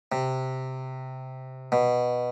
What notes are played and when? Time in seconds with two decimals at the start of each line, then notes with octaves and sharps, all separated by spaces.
0.12 C3
1.72 B2